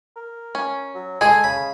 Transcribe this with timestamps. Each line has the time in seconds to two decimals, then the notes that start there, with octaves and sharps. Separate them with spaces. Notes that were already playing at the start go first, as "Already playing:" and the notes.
0.16 A#4
0.55 C#4
0.94 F#3
1.21 G#3 G#4 A4 G#5
1.44 C#3 B5